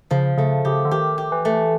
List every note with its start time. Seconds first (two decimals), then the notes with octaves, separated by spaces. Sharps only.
0.11 C#3 F3
0.38 C#3 A3
0.65 C#3 G4
0.85 D3
0.91 D#3 G4
1.18 G4
1.32 E3
1.45 A3